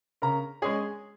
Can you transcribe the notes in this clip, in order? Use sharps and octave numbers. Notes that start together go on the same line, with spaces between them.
C#3 A#4 A#5
G#3 C#4 G#4 G#5